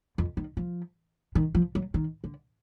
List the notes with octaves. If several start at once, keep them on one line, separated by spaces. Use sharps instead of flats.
F2
D#3
F3
D#3
F3
F#3
D#3
D3